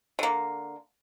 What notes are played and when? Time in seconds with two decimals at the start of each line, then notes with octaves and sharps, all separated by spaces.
0.19 D3 A#3